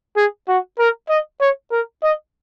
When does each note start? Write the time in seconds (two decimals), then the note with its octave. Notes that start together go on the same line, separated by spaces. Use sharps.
0.17 G#4
0.48 F#4
0.79 A#4
1.09 D#5
1.41 C#5
1.71 A#4
2.03 D#5